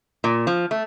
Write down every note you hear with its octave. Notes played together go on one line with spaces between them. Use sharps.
A#2
F3
A3